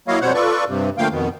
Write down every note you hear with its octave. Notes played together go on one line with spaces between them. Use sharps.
F#3 A#3 E4 C#5 D#5 F5
F2 B2 G3 C5 C#5 F#5
F4 A4 B4 D5 C#6
G2 C3
D3 F3 A3 A#3 F5 G5
F2 B2 D#3 B3